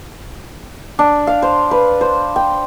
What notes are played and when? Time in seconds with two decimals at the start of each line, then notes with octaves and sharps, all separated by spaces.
0.99 D4
1.27 F5
1.42 C5
1.71 B4
2.01 C5
2.36 G5